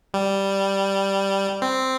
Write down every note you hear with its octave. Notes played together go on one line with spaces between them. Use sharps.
G3
C4